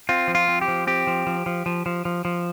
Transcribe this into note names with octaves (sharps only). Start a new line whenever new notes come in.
C4 F4
F3
F4
C4
G4
F3
C4 G4
F3
F3
F3
F3
F3
F3
F3